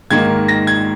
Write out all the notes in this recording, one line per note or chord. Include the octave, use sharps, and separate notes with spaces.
G#2 D#3 A#3 G#6
A#6
G#6